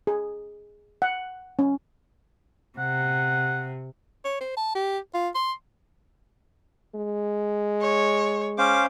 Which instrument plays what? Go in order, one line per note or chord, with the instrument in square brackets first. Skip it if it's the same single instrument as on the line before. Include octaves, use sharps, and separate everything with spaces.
[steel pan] G#4
F#5
C#4
[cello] C3 [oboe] F#5
[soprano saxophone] C#5
C5
A5
G4
F4
C6
[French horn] G#3
[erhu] C#5
[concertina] C#4 C5 F5 [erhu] D6